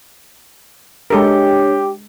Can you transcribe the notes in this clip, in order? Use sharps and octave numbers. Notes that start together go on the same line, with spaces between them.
G#3 D4 G4 A4 A#4 C#5 G5